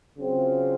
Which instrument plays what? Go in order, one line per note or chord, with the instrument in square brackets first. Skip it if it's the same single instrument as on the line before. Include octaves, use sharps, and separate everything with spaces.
[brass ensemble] C#3 F#3 C4 F4